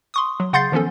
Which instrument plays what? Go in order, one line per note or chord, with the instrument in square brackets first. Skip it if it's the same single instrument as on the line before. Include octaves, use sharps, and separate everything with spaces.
[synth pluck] C6 C#6 D#6
F#3
C#3 F#5 C6 G6 A6 C7
D#3 F3 B3 C#4 A4